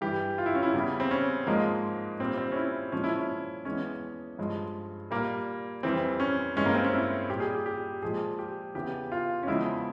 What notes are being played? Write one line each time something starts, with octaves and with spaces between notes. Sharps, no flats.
G2 E3 G3 G4
F4
E4
C#4
E4
E2 C#3 G3
C4
C#4
G#2 F3 G#3 A#3
A#2 G3 C4
C4
C#4
E4
A#2 F3 G#3 C#4
E4
C#4
E2 E3 G#3 C#4
G2 F3 G#3
A#2 G3 A#3
F2 E3 G3 C4
C#4
G2 E3 G#3 C#4
A#3
C4
C#4
E4
A#2 G3 G4
G#4
G4
G4
A#2 F3 G#3 G#4
G4
E2 C#3 E3 G4
F4
C#4
E2 C#3 F3 G#3 E4